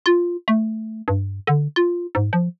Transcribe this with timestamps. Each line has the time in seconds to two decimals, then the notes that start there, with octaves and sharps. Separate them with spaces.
0.06 F4
0.48 A3
1.08 G2
1.47 D3
1.76 F4
2.15 G#2
2.33 F3